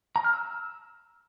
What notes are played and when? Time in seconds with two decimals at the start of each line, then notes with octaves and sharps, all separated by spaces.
0.16 A#5
0.24 F6
0.33 E6